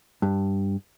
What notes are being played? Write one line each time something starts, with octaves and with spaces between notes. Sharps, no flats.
G2